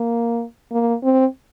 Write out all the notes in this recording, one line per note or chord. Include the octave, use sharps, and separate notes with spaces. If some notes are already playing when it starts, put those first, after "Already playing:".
Already playing: A#3
A#3
C4